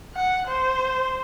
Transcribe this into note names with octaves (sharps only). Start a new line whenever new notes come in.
F#5
C5